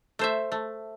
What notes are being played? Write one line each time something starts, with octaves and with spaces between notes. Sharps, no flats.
A3 C5 E5
A3